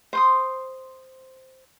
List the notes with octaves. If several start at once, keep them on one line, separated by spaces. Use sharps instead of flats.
C5 C6 D#6